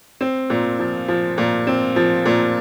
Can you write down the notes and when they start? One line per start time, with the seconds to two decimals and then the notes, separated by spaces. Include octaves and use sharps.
0.21 C4
0.50 A#2
0.79 F3
1.08 F3
1.38 A#2
1.67 C4
1.96 F3
2.26 A#2